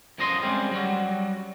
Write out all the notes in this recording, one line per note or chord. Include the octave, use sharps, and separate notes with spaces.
F#2 A#2 F3 D#5 A#5 C6
G3 G#3 C4 C#4
F#3 G3 F#4